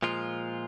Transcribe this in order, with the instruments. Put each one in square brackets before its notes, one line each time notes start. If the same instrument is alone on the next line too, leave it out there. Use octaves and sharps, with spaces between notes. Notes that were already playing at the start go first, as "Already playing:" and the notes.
[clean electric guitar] A#2 F3 G#3 F4